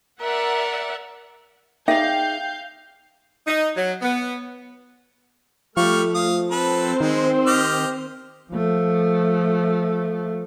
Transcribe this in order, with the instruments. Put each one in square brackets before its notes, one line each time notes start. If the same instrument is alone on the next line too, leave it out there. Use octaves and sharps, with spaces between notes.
[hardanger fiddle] A#4 [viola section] D5 E5 F#5
[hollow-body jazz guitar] D#4 G#4 D5 [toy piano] E5 [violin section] F5 G6 [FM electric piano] G5
[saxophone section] D#4
F#3
B3
[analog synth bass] F3 [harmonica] G3 C#6 F6 [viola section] A3
[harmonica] F5 D#6
[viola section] C4 C5 [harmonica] A4 B4
[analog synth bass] D#3 [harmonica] G#3
[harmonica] G4 D#5 F6
[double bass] F3 A3